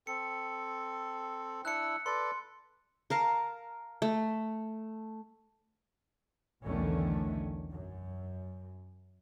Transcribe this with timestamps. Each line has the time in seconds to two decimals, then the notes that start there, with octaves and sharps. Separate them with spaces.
0.07 C4 A4 C#7
1.65 D4 E4 E6 F#6 C#7
2.06 A4 B4 D5 C6
3.10 A#4 F5 A5
4.02 A3
6.65 B1 E2 D3 D#3 A3 C#4
7.73 F#2